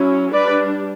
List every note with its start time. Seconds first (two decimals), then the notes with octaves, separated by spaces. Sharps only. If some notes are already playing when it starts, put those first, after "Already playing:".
Already playing: F#3 C#4 E4
0.33 G3 D4 B4 D5